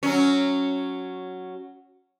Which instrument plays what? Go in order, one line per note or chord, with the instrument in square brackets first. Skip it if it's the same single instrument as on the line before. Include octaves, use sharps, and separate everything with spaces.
[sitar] F#3 C#4